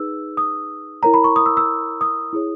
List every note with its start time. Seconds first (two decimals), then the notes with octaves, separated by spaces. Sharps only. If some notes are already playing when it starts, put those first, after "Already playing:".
Already playing: D#4 G#4 B4 E6
0.37 D#6
1.03 E4 A#4 C#5 A#5
1.14 B5
1.24 C#6
1.36 D#6
1.46 E6
1.57 E6
2.01 D#6
2.33 E4 G#4 C#5